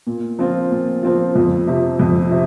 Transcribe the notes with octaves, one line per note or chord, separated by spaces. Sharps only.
A#2
F3 C4 F4
A#2
F3 C4 F4
F2
C3 F3
F2
C3